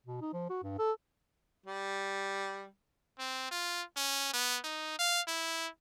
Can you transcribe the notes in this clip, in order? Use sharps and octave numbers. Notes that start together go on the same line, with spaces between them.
B2
D#4
F3
F#4
G2
A4
G3
C4
F4
C#4
B3
D#4
F5
E4